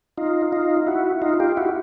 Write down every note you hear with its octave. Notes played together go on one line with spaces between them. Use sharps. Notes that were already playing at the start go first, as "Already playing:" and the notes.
D#4 F4
D#4 F4
E4 F#4
D#4 F4
F4 G4
E4 F#4